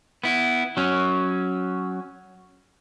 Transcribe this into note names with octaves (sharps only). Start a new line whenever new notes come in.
B3 E4
F#3 C#4